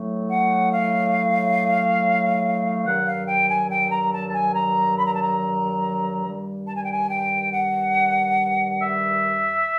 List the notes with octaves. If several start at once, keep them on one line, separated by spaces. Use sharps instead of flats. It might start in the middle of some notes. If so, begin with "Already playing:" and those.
Already playing: A2 F#3 A3
F#5
F5
G2 D#3 F#3 F#5
F5
G5
G#5
G5
A#5
A5
A5
G#5
A#5
B5
A#5
A5
A#5
G2 D#3 G3
A5
G#5
G5
G#5
G5
F#5
E5